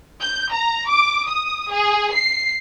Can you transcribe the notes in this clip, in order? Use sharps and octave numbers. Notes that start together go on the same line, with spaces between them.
G6
A#5
D6
D#6
G#4
C7